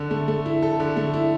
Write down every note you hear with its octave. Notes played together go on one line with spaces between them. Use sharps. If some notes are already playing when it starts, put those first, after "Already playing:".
Already playing: D3 A4
A3
A3
E4
A4
D3
A3
E4